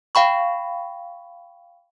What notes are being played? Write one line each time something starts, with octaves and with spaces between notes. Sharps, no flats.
F5 G5 B5 C#6